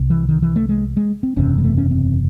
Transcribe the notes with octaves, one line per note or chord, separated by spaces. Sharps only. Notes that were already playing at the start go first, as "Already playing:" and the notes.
Already playing: C2 C3
E3
D#3
E3
A3
G#3
G#3
C4
F#1 E2 C3 C#4
G#3
A3
C#4
C4